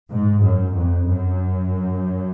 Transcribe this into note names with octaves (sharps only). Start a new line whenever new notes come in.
G#2
F#2
F2
F#2